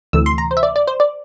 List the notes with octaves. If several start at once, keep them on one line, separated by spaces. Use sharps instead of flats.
D2 C3 E3 A3 E6
C6
A#5
C5
E5
D5
D5
C5
D5